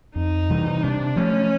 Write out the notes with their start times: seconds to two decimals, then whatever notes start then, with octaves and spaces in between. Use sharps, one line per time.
0.16 F2 D#4
0.49 C3 E3 G3
0.83 C3 D4
1.16 F3 A3 C#4